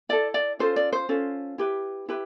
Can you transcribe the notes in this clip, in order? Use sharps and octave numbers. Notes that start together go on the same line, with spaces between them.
E4 A4 D5
D5
C#4 F4 A4 C5
D5
C5
C#4 F4 A4
E4 G4 B4
E4 G4 B4